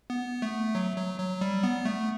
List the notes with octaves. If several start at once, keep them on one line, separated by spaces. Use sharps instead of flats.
B3
A3
F#3
F#3
F#3
G3
B3
A3